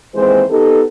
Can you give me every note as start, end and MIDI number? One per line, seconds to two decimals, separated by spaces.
0.15 0.43 39
0.15 0.43 52
0.15 0.43 56
0.15 0.43 60
0.15 0.43 72
0.50 0.83 59
0.50 0.83 63
0.50 0.83 67
0.50 0.83 69